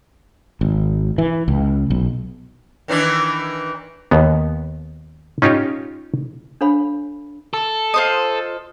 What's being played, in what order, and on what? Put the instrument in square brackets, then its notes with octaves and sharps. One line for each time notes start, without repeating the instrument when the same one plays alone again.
[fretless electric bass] G#1
E3
C#2
B1
[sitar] D#3 E3 D4
[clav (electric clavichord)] D#2 B3
C#4 D#4 F4 G4 C#5
[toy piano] D4 A4 C#5 F5 B5
[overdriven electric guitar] A4
[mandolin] F4 C5 D#5